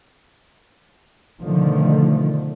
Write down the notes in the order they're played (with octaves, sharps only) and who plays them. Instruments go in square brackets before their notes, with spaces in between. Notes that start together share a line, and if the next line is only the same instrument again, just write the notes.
[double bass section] B2 D3 D#3 F3 A3